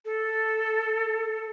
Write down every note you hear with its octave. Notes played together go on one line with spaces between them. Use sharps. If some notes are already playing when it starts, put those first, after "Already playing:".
A4